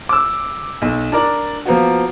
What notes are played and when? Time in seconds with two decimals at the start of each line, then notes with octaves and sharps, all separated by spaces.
0.09 D6 E6
0.82 B1
1.12 D4 A#4 D5
1.66 F3 A#3 B3 F#4